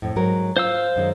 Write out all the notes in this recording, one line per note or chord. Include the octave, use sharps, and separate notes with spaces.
F2 A2
G#2 F#3 A#4
F4 C5 F5 E6
F#2 D#3 G#3